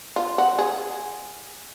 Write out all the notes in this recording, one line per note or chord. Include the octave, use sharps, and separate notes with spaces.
F4
F#4
G#4